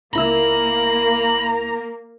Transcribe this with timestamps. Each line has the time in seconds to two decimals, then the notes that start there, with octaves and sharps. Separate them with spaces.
0.13 C#2 A#3 E4 A#5 B5 E6